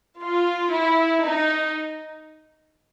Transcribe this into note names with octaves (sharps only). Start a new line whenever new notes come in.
F4
E4
D#4